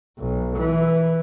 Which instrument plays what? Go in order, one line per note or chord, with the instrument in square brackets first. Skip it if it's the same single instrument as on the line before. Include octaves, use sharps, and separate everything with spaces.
[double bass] B1
E3